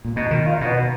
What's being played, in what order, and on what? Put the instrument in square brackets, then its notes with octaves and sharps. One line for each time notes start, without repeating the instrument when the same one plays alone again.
[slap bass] A#2
[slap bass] B2 [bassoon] D#4
[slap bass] D#3
[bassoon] F4
D#4
[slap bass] B2
[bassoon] B3